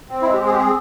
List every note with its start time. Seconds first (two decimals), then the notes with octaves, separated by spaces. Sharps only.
0.10 C4
0.22 E4
0.25 G#3
0.34 G4
0.41 C4 G#4
0.52 G4
0.57 C4 G#4